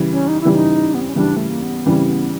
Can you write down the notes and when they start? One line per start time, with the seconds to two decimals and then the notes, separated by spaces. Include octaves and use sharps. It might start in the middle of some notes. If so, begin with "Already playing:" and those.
Already playing: C#3 E3 G3
0.11 C#4
0.28 D#4
0.41 C#3 E3 G3 E4
0.53 D#4
0.94 B3
1.01 C4
1.09 C#4
1.15 C#3 E3 G3 D4
1.37 A3
1.49 A#3
1.62 B3
1.86 C#3 E3 G3 C4
2.10 B3